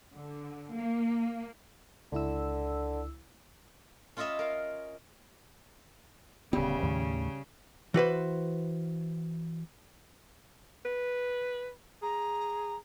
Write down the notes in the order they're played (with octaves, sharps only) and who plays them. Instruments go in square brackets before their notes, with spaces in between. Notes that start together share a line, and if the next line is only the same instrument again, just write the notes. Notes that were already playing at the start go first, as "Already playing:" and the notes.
[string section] D3
A#3
[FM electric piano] C#2 E4 E6 [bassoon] D3
[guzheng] C#4 F4 C#5 D#5 E5 B5
A#4 F5
[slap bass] D1 B3 [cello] C#3 [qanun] G3
[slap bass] D#2 A2 D#3
[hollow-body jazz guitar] E3 F#4 B4 C5
[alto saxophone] B4
[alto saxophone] G#4 [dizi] A#5